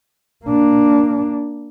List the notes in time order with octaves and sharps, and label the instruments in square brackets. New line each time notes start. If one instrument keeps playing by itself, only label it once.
[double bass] A#3 D4